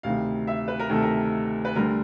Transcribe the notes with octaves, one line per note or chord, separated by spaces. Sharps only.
D2 C3 D#3 F5
E5
B4
A#4
D2 C3 D#3 A4
A#4
B4
D2 D3 G3 A#4